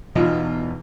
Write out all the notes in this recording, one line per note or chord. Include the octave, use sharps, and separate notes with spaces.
E2 B2 E3 D#4 F4